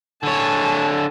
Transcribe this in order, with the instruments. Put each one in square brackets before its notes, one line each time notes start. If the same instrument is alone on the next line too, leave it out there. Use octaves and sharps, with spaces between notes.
[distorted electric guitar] D3 C#5 [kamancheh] G#5 A5